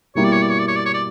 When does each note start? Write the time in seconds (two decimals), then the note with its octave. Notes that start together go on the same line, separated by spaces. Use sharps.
0.15 B2 G3 A#3 E4 G4 C#5
0.24 D5
0.32 C#5
0.42 D5
0.50 C#5
0.59 D5
0.68 C#5
0.76 D5
0.86 C#5
0.94 D5